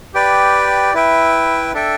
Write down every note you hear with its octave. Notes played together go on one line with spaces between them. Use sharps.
G4 B4 D5 G5
E4 B4 E5 G5
D4 A4 E5 G5